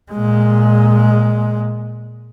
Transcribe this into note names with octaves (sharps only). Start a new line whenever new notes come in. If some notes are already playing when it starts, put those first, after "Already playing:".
A#2 G#3